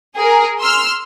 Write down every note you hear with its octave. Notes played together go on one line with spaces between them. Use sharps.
G#4 A#4
C6 E6 F6